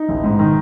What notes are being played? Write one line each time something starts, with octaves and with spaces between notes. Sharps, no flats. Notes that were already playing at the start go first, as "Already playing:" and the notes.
Already playing: D#4
A1
G#2
D#3